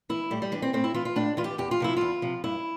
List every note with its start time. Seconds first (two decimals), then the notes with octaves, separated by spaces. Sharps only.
0.09 E3 E4
0.30 A2 G3
0.42 G3
0.52 E3 D4
0.62 C4
0.73 A2 C4
0.84 E4
0.94 E3 F4
1.05 F4
1.16 A2 D4
1.37 E3 F4
1.44 G4
1.58 E2 G4
1.71 F4
1.80 C3 F3 E4
1.97 E2 F4
2.22 C3 F3
2.44 G2 E4